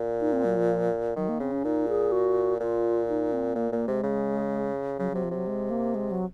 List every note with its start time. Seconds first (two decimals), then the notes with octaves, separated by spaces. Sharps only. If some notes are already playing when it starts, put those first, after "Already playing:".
Already playing: A#2
0.20 D#4
0.32 C4
0.45 F#3
0.56 F3
1.16 D#3 F#3
1.29 A#3
1.40 C#3 C4
1.52 C#4
1.65 A#2 D#4
1.88 G#4
2.12 F#4
2.60 A#2 F4
3.08 D#4
3.32 C4
3.55 A#2 A#3
3.72 A#2 A#3
3.88 C3 G#3
4.04 C#3
4.99 C#3 F#3
5.11 C3 F#3
5.23 F3
5.31 C3 F#3
5.47 G#3
5.70 A#3
5.95 G#3
6.11 F#3